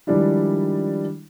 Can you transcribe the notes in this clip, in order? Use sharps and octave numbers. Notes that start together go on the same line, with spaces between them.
D#3 F3 G3 G#3 D4 E4